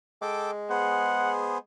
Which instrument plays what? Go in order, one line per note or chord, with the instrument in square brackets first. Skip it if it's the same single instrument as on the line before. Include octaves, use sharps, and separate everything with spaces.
[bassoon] G#3 [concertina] A4 G5 D6
[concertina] B3 G#4 C5 [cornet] F#5